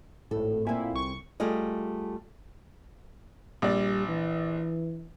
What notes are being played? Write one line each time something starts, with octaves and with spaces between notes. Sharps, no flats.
G#1 A2 A4
A#2 A#3 C4 E4 G#5
C2 C#6
G3 A3 F4 G#4 D#5
A#1 G3 D5
E3